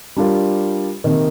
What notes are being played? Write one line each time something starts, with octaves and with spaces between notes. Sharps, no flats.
G3 D4 F4 A#4
C3 D#3 A#3